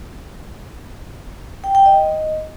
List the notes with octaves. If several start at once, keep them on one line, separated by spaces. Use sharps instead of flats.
G5
G5
D#5